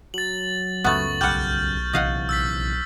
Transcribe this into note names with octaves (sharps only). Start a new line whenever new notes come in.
F#3 A6 F#7
C#2 F#2 C#3 A3 B3 C#6 A6 F#7
B1 G3 F#5 F6 G6
A#1 C3 E3 D#5 F5 F#5
E6 A6 B6